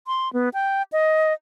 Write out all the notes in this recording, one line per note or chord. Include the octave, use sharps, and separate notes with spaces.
C6
B3
G5
D#5